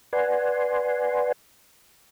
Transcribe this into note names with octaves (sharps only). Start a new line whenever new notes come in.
B4 D5 F#5 G#5 C6